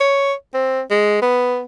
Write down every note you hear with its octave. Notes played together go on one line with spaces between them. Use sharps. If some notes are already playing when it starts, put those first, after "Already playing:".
C#5
C4
G#3
B3